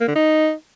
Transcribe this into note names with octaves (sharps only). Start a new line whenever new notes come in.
A#3
D3
D#4